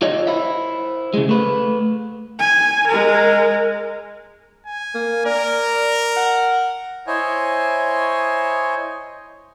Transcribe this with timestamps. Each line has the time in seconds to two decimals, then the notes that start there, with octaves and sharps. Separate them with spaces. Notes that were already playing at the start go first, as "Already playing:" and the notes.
0.02 F4 C#5 D#5 E5
0.27 E4 C5 E5
1.14 C#3 G#3
1.29 A3 B4
2.39 G#5
2.87 G#3 A#4
4.67 G#5
4.95 A#3
5.26 A#4 D5
6.17 F#5
7.07 E4 C5 C#5 D#5 G#5